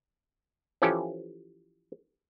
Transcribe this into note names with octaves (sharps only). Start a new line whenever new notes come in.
E3 F3 C#4 G4 A4